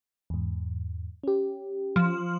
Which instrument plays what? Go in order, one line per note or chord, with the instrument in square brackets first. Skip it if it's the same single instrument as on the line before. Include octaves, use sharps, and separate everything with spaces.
[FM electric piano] E2 G#2
C#4 G4
[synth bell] F3